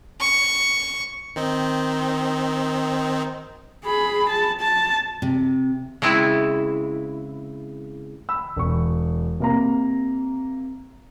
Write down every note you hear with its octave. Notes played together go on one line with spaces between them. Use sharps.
C#6
D#3 C4 D#4
G#4 B5
A5
A5
C3
C#3 G#3 C4 E4
B5 E6
E1 C#6
C3 A#3 A#5